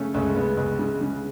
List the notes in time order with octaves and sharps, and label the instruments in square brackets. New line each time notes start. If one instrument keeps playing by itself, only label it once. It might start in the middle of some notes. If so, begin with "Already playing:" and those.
Already playing: [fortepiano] C#3 A3 C#4
C#2 A3 C#4
C#2 B3
C#2
C#3
C#3